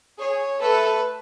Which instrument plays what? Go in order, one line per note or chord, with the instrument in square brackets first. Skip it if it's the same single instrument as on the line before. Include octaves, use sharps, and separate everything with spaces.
[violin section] G#4 [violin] C#5
[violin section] A3 A4 [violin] B4